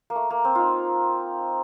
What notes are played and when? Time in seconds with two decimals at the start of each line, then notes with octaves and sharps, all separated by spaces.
0.10 A#3
0.15 A3
0.30 A#3
0.45 C4
0.55 D#4 F4